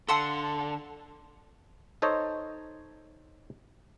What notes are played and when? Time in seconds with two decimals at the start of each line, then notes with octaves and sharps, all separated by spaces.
0.09 D3 A4 F5 F#5 A5 C6 E6
2.02 D#4 A4 C5 C#5 D#5